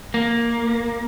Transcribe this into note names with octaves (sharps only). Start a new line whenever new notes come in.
A#3